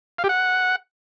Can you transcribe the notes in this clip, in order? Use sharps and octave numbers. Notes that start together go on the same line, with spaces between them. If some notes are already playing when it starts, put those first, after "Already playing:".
F5
G4
F#5